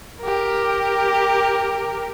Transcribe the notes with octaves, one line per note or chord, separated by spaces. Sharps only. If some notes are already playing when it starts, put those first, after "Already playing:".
G4 A#4